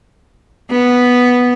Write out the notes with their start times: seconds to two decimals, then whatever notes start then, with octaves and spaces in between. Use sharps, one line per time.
0.71 B3